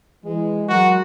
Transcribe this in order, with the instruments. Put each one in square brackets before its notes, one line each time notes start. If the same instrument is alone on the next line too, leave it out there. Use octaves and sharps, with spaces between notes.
[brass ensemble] E3 G#3
[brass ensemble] F#3 G#3 A#4 [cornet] F#4